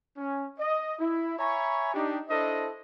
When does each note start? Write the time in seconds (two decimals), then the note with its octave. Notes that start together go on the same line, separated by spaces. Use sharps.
0.17 C#4
0.59 D#5
0.99 E4
1.39 C#5 E5 G#5 A#5 B5 C#6
1.93 D4 D#4 G4
2.29 D4 E4 A4 C5 D#5